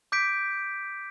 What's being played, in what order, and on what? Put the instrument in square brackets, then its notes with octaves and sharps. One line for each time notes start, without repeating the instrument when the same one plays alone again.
[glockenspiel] D6 G6 B6 D7